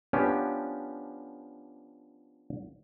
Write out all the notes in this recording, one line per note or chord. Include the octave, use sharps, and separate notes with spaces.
F3 B3 C#4 D4 G4